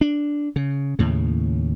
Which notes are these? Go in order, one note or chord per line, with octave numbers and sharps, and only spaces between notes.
D4
C#3
D#2 A2 C#3